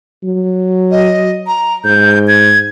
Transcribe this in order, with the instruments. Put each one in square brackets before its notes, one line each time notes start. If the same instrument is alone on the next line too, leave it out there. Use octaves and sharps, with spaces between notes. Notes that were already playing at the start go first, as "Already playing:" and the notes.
[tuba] F#3
[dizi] D#5
A#5
[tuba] G#2 [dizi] G6
[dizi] G#6